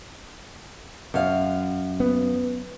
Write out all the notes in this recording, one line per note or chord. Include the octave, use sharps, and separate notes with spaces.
F#2 F5
B3